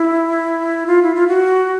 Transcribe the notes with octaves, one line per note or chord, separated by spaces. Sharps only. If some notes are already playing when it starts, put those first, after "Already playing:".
Already playing: E4
F4
E4
F4
F#4